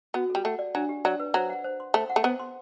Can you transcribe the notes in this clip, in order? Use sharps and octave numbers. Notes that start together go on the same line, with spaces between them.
B3 F#4
G3 A4
A3 F#5
D5
F#3 D4
G4
F#3 D5
B4
F#3 C5
F#5
C5
C6
A3 C5
F#5
A3
B3 C5
C6